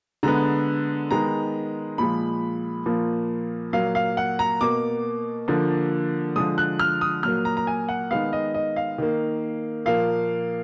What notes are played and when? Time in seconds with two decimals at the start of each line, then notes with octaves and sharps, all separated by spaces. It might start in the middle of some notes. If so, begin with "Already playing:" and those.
0.23 D3 G#3 B3 A#5
1.11 D#3 G#3 B3 A#5
1.98 A#2 F3 G#3 B5
2.86 A#2 F3 A#3
3.73 A#2 F#3 A#3 F5
3.95 F5
4.17 F#5
4.39 A#5
4.61 B2 A#3 D6
5.48 D3 F3 A#3
6.36 D3 F3 G#3 D#6
6.58 F#6
6.80 F6
7.01 D#6
7.23 A#2 F#3 A#3 F6
7.45 A#5
7.57 A#5
7.67 G#5
7.89 F#5
8.11 D#3 G#3 B3 F5
8.33 D#5
8.54 D#5
8.76 F5
8.98 D#3 A#3
9.86 A#2 F3 A#3 F5